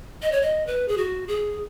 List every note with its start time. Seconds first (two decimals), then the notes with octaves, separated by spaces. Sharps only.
0.22 D#5
0.32 C#5
0.42 D#5
0.67 B4
0.88 G#4
0.97 F#4
1.28 G#4